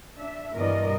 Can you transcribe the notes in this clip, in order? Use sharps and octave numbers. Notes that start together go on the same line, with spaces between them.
D4 E5
G2 B2 E3 A#4 D5 D#5